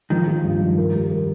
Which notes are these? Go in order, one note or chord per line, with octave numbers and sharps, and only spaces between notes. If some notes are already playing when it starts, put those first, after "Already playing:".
D#3 F3
F4
G2
F3
A#4
G3
A#4